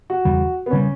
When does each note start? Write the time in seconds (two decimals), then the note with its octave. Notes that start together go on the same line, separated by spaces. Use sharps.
0.10 F#4
0.25 E2 C#3 G3
0.66 B3
0.71 C#3 G3 C#4